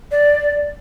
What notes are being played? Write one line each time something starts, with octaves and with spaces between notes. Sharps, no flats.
D5